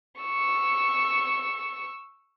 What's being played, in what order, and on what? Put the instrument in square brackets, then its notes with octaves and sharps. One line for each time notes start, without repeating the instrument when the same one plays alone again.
[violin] C#6 E6